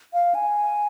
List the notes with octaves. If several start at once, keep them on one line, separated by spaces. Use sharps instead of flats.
F5
G#5